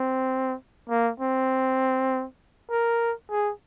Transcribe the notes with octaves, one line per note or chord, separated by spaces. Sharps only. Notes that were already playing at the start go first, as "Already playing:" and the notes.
Already playing: C4
A#3
C4
A#4
G#4